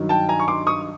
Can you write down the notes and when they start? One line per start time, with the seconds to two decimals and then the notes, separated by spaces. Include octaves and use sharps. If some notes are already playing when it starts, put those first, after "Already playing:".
Already playing: G2 D#3 F#3
0.09 G5 A5
0.29 G#5 A#5
0.40 C#6
0.48 C6 D6
0.67 C#6 D#6